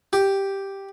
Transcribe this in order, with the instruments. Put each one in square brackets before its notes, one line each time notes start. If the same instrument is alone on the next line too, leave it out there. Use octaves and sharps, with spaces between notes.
[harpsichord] G4